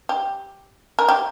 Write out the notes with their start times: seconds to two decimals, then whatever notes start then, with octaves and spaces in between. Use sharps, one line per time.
0.09 G4
0.99 A#4
1.09 G4